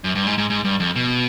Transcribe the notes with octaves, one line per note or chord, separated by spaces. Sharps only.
F#2
G2
G#2
G#2
G#2
G2
F2
B2